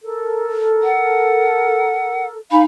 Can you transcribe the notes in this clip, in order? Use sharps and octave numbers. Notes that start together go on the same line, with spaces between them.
A4 A#4
F#5
D#4 F5 G#5 B5